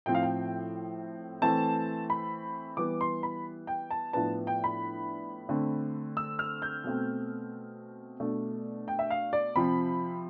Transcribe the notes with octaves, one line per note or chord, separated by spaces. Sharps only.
A2 F3 C4 G5
F5
G5
E3 A3 C4 A5
B5
E3 G3 B3 D6
C6
B5
G5
A5
A2 F3 B3 D4 A5
G5
B5
D3 A3 C4
E6
F6
G6
B2 A3 C4
B2 A3 D4
G5
E5
F5
D5
C3 F3 C4 B5